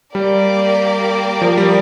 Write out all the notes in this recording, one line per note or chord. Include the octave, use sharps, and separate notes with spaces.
G3 A#3 G4 A#4 D5
F3
G3